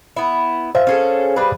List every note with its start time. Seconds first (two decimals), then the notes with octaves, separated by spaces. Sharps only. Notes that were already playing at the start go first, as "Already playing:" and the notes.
0.17 B3 E4
0.75 C5 E5 F5
0.87 C#4 G#4 A4
1.36 G3 G#4 B4